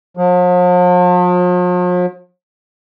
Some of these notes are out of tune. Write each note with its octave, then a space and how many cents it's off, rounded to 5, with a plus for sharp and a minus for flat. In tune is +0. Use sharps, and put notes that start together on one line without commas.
F3 +45